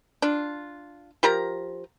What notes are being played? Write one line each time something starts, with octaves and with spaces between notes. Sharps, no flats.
D4 F4
F3 G4 A#4 A#5